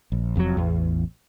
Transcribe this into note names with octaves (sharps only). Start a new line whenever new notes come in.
A#1
F1 F2 A2 F#3
A1 E2